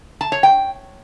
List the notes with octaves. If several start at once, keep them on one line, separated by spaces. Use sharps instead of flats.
A5
C#5
G5